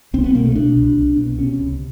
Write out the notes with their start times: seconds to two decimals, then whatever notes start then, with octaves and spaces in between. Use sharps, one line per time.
0.14 C2 C4
0.24 B3
0.35 B2 A#3
0.45 A3
0.55 B2 D4
0.76 C2
0.97 C2
1.17 B2
1.38 C3 C#4
1.59 C#2